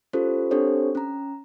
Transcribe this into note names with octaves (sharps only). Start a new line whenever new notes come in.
C#4 F4 G4 A4 C5
C4 D4 G4 A4 C5 C#5
C#4 A#5